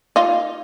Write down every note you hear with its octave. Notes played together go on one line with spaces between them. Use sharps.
D#4 F4